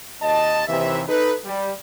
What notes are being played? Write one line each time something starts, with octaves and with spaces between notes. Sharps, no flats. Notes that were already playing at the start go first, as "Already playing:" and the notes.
D#2 D#5 A5
D#2 C3 E3 E5
D#4 A4 B4
G3